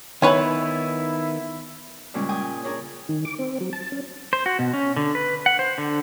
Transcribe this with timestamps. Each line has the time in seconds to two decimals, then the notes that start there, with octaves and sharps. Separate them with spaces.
0.22 D#3 B3 D#4 E4 B4 C#5 G#5
2.14 G2 A#2 C#3 G3 G#3 C#4
2.29 G5 G#5 D#6
2.64 C#4 D4 G#4 A#4
3.09 D#3
3.25 D6
3.39 C4
3.61 F#3
3.73 A5
3.92 C#4
4.33 C5
4.46 F#4
4.59 B2
4.74 C#4
4.96 D3
5.15 B4
5.46 F#5
5.59 C5
5.78 D3